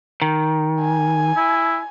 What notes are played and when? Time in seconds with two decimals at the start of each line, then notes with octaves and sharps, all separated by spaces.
0.22 D#3
0.81 G#5
1.37 E4